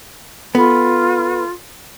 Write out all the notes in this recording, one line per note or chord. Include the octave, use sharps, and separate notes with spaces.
B3 F4 A4 B5